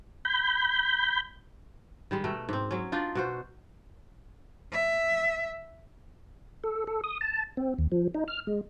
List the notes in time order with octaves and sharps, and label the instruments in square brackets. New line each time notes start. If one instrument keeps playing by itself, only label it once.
[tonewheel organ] B5 G6
[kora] D#3 G3 G#3
B2 A3 A#4
G#2 C4
F#3 C#4
D4 D#4 F4 D5
B2 F#4 C5
[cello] E5
[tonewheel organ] A4
A4
D#6
A5
C4
D#2
F3
D#4
F6
G#3